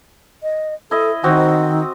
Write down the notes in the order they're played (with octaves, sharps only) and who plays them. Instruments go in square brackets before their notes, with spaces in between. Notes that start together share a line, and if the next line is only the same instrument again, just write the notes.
[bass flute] D#5
[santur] E4 D#5 [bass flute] A4
[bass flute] D#3 [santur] C4 F#4 D#6